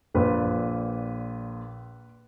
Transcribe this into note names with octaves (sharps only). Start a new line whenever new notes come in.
A#1 A#2 B4